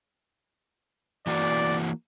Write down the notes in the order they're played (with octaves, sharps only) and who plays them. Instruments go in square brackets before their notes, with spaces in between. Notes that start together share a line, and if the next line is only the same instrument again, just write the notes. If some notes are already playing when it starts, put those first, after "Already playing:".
[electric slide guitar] E3 A#3 F#4 [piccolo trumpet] D5